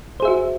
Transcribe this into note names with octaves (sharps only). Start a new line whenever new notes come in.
F#4 G#4 C5 E5